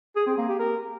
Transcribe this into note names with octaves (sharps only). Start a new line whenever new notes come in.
G#4
C4
A#3
G4
A#4